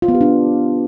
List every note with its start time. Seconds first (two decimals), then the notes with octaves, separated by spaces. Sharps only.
0.02 F4
0.08 B3
0.15 G4
0.21 D4